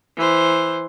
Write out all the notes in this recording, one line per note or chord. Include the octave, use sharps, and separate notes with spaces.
E3 C5